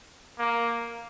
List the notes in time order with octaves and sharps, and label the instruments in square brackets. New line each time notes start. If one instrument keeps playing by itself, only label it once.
[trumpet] A#3